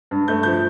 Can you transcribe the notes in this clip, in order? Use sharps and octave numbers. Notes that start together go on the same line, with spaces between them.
G2
A3 G6
F3 G6